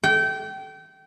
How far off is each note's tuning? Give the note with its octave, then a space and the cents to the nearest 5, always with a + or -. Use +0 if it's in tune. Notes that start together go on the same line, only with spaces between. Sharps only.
G5 -25